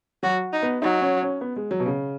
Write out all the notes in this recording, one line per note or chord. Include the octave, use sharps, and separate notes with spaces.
F#3 F#4
D#4
B3
F#3 D#4
C#4
C#4
B3
G#3
F#3
B2
C#3